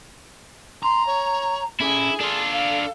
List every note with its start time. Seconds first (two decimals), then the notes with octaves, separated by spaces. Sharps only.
0.83 A#5 C6
1.06 C#5
1.80 C#4 E4 G#4 A4
2.21 D4 F4 A4
2.53 F5